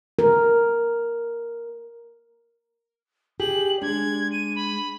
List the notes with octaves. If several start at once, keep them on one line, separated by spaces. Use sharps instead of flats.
A#4
G4 G#4 F#7
G#3 D4 G#6
D#7
B5